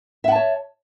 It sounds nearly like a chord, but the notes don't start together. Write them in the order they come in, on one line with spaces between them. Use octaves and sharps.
E5 F#5 A5 C#5